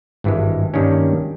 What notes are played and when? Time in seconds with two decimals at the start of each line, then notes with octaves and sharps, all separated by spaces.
0.24 G#1 G2 E3 G#3
0.74 G2 D#3 G3 A#3 C#4